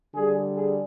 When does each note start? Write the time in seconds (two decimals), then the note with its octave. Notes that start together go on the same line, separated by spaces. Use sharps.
0.14 D3 G3 G#4
0.56 G#4